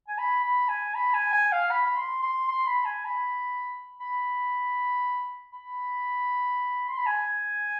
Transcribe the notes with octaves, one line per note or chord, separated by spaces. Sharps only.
G#5
B5
B5
G#5
B5
G#5
G#5
F5
B5
B5
C6
C6
C6
B5
G#5
B5
B5
B5
C6
B5
G#5